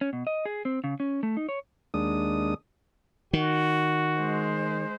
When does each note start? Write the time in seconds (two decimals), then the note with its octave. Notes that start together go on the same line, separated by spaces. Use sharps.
0.01 C#4
0.13 B2
0.27 D#5
0.46 G#4
0.65 C4
0.84 C#3
1.00 C#4
1.23 A3
1.37 D#4
1.49 C#5
1.94 D#2 G#3 D4 D#6
3.33 D#3 F#4
4.18 G#3 C5